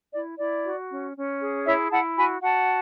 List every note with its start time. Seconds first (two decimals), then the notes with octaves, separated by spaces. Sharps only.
0.13 E4 D5
0.38 E4 D5
0.64 F#4
0.90 C#4
1.15 C#4
1.40 G#4
1.66 E4 C#5 E5
1.92 E4 F#5 A5
2.18 F#4 G#5 B5
2.43 F#4 F#5 A5